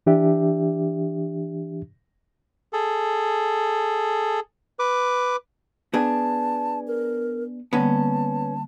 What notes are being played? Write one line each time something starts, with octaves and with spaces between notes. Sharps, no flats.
E3 D4 G4 E5
G#4 A4
B4 D6
B3 D4 G#4 A5
A#4
D3 G3 A#3 B3 C#4 A5